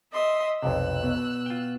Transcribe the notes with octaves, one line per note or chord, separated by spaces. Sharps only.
D#5 E5 C6
B1 F2 C3 E6 F#6
B2
F4 G5